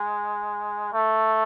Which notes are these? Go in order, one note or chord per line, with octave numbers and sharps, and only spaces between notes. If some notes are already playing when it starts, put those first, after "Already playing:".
Already playing: G#3
A3